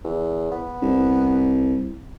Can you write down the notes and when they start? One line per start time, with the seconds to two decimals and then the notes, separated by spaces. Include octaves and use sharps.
0.04 E2
0.52 B3
0.82 C2